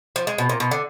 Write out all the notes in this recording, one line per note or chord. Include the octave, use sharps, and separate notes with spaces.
F3
G#3
B2
A#2
B2
D3